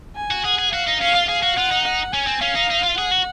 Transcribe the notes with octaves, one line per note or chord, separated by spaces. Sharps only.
G#5
F#4
G#4 F#5
G#4
F#4 F5
D#4
C#4 F5
F4
G#4 F5
F#4
F4 F#5
D#4
F#5
C#4 G#5
C4
C#4 F5
D#4
D#4
F4
G#4 F#5
F#4